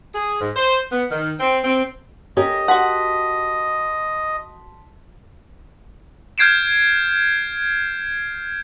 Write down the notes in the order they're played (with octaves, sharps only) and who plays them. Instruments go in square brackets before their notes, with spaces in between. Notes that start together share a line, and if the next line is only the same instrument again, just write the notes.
[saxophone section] G#4
G#2
C5
B3
D#3
C4
C4
[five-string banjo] C#4 [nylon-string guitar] G4 A#4 [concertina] D#5
[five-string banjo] F#4 F#5 [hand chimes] A5 C6 B6
[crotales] F6 G6 G#6 C7 D7 E7